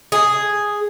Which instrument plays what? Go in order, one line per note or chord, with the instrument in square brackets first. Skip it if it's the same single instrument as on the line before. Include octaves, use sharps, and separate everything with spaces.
[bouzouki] G#4